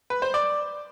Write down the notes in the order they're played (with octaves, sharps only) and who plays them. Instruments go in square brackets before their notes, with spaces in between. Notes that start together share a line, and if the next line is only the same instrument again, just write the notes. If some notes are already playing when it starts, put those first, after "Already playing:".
[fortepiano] B4
C5
D5